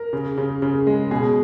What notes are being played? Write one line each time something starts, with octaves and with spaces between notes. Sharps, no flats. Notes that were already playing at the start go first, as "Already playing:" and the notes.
Already playing: A#4
C#3
C#3
C#3
G#3
B2 G#4